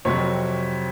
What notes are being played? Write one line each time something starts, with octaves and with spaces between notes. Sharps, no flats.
F2 C3 F#3 C#5